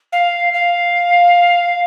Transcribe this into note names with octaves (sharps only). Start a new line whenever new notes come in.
F5
F5